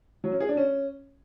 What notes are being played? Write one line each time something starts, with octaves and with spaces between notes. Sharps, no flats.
F#3
C#4
G#4
D4
C#4